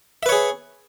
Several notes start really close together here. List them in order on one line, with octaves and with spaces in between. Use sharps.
E5 B4 C#5 G#4